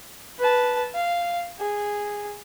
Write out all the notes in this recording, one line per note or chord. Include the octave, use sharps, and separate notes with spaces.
B4 A5
F5
G#4